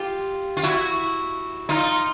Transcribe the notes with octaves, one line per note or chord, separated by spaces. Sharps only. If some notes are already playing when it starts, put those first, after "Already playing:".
Already playing: F4 G4
F4
E4 F#4
D#4 F4